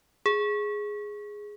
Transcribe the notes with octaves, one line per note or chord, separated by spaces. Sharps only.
G#4